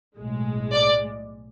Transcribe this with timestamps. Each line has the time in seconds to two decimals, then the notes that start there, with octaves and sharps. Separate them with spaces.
0.17 B1 A2 G#3
0.72 D5